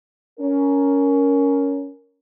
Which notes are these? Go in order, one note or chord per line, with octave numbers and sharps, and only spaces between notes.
C#4 A#4